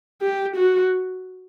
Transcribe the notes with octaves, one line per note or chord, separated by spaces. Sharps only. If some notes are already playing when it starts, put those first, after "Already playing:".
G4
F#4